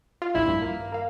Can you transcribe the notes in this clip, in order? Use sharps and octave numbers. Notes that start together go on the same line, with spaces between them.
F4
A#1 D#2 E4
G2
A#3
A#4 F5